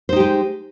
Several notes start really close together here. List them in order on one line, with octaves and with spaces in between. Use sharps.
C5 D#4 G4 G#3